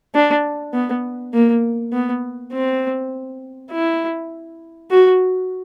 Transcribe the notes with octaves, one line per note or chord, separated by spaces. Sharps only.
D4
B3
A#3
B3
C4
E4
F#4